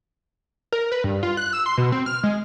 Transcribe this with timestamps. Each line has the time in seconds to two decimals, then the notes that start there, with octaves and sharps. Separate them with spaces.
0.72 A#4
0.92 B4
1.04 G2
1.23 F4
1.37 F#6
1.53 E6
1.66 C6
1.78 B2
1.92 C4
2.06 F6
2.23 G#3